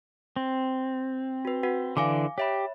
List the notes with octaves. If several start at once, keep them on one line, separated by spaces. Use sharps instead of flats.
C4
F#4 B4
F#4 B4 F#5
D3 E3 D5 F5 G#5 D6
G4 C#5 E5 B5